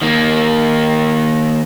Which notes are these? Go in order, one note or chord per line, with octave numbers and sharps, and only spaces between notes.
D#3 A#3